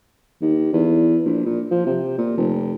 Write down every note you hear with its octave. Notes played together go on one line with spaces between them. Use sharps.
D#2
E2
A#1
A#2
F3
C3
A#2
F1